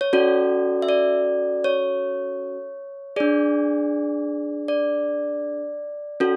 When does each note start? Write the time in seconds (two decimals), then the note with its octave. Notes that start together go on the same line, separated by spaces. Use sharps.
0.01 C#5
0.13 C#4 F#4 A4 D5
0.82 E5
0.89 D5
1.64 C#5
3.16 D4 G#4 D5
4.68 D5
6.20 C#4 F#4 A4